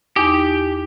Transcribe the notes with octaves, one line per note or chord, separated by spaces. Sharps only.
E2 D#4 G4